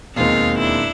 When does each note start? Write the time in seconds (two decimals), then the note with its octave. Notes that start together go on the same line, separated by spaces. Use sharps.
0.16 E1 D#2 D#3 G#3 C4 D#4 F4
0.59 D4 E4